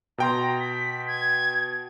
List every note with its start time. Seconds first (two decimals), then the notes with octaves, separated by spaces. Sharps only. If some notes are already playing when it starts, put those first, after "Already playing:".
0.18 B2 G5 A#5 C6
0.60 B6
1.07 G#6